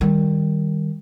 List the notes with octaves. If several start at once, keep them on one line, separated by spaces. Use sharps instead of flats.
D#3 G3